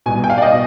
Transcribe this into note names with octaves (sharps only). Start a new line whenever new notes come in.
C2 B2 G#5
G5
F5
D5
B2 D#5